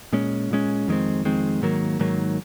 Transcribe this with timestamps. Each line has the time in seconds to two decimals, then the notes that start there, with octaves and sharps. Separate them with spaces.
0.13 A#2 G#3 C#4
0.51 A#2 G#3 C#4
0.87 F2 D#3 G#3 C4
1.25 F2 D#3 G#3 C4
1.62 G#2 D#3 F#3 A#3
1.99 G#2 D#3 F#3 A#3